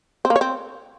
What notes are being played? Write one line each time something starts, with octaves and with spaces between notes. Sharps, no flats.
C4
A#3
C#5
C4